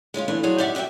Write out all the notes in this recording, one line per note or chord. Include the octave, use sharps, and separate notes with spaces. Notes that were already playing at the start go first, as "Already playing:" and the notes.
G#3 C#4 E4 F4
E2 A#2 E3 A3 D4
F3 F#3 G#4 C#5 D5
G#2 G4 D5 E5 F#5
F#4 G4 C#5 E5 G5